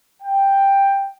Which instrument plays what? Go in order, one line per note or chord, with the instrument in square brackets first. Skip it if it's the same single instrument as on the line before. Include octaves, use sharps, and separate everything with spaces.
[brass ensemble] G5